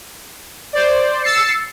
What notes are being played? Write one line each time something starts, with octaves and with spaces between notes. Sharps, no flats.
C5 D5
E6 A6 C7 C#7